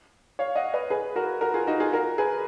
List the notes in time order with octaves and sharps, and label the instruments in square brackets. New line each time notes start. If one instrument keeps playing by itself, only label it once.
[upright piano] C#5 F5
D#5 F#5
B4 D#5
G#4 B4
F#4 A#4
F#4 A#4
F4 G#4
D#4 F#4
F4 G#4
F#4 A#4
G#4 B4